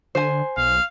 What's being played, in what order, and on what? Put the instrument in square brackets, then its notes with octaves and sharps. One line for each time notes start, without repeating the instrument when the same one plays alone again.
[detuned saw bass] D3 [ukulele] C5 G#5
[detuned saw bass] B1 [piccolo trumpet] F5